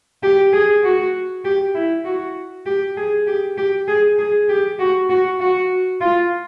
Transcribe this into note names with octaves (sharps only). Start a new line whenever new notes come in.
G4
G#4
F#4
G4
E4
F#4
G4
G#4
G4
G4
G#4
G#4
G4
F#4
F#4
F#4
F4